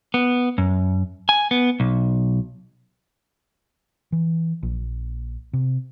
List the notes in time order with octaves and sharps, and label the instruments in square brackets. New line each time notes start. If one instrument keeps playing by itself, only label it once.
[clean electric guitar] B3
F#2
G#5
B3
B1
[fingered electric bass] E3
A#1
C3